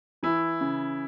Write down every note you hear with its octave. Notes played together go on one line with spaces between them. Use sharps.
E3 E4
C#3